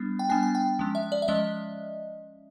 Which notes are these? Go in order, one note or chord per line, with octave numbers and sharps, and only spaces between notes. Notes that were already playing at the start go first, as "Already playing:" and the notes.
Already playing: G3 B3 D4
G5
G3 B3 D4 G#5
G#5
G5
F3 G#3 C#4
E5
D5
E5
F3 G#3 C#4 D#5